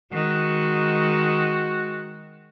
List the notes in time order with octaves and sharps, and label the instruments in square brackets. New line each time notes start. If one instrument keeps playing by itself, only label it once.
[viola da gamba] D#3 G#3 [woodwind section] F#4